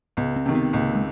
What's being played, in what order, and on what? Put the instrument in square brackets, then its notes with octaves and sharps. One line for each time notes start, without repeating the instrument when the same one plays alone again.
[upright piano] C#2 [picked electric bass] B3
[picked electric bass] C4
[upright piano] C3 D#3
[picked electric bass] B3
[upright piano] C#2 [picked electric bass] A#3
[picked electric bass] G#3